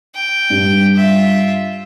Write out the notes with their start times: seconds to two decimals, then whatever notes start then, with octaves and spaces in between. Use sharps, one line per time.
0.15 G5
0.50 G2
0.96 F4 E5